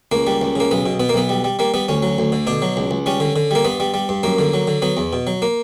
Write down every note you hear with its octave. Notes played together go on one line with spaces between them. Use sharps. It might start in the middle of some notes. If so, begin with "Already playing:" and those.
C#2 A#3
G3
C#2
C#3 A#3
B1 B3
B2
B2 B3
A#3
B1 B3
G3
G3
G3 A#3
G3 B3
D2 C#4
F#3
D2
D3
B2 D4
F#3
C#2
C#2
G3 C#4
D3
D3
G3 A#3
G2 B3
G3
G3
G2
F#2 A#3
D3
F#3
D3
F#3 B3
E2
B2
F#3
A#3